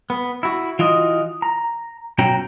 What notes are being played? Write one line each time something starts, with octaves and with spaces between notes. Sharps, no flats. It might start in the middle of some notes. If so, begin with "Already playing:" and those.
B3
E4 F#4
E3 F4 F#4 D#5
A#5
B1 B2 C#4 F#4 G5 A#5